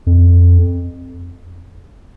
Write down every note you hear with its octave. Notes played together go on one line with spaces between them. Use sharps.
F2